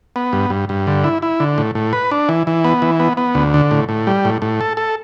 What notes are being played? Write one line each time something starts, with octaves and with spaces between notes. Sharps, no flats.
B3
G2
G2
G2
D3
E4
E4
D3
A2
A2
B4
D4
E3
E3
B3
E3
B3
B3
D2
D3
A2
A2
G3
A2
A2
A4
A4